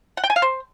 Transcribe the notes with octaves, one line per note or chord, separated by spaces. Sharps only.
F#5
G5
G#5
F5
C5